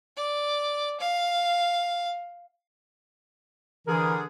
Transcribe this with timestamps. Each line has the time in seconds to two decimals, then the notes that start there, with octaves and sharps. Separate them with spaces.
0.17 D5
1.00 F5
3.87 D3 E3 G#4 A#4